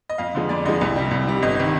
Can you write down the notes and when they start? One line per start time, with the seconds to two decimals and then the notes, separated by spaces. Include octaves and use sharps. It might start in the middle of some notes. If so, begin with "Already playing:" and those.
0.10 D#5
0.18 F2 F5
0.35 D3 F3 G#3
0.49 F2 D5
0.65 D3 F3 G#3 D#5
0.81 C2
0.96 C3 G3
1.11 C2
1.27 C3 G3
1.42 G1 D#5
1.59 C3 D#3